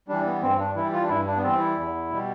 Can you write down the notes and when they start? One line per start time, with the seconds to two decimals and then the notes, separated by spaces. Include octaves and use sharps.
0.08 E3 G3 D4
0.26 B3
0.42 G2 C4
0.59 D4
0.76 E3 G3 E4
0.93 F4
1.03 D4
1.09 G2 E4
1.27 D4
1.37 B3
1.43 E3 G3 C4
1.60 E4
1.77 E2
2.10 B2 G3